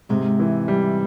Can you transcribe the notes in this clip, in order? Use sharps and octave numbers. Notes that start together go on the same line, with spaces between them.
G#2 C3 G#3
E3
G3